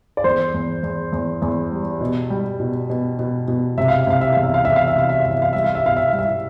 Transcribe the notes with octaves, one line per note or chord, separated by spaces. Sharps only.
D5
E2 C5
E2
E2
E2
E2
G3
B2
G3
B2
B2
B2
B2
C3 E5
F5
E5
C3 F5
E5
E2 F5
E5
F5
E2 E5
F5
E5
C3 F5
E5
E2 F5
E5
F5
G3 E5
F5
E5
B2 F5
E5
F5
G3
E5